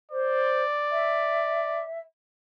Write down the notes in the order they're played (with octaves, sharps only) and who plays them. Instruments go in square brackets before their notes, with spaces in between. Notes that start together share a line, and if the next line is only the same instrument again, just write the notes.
[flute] C5 [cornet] D5
[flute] E5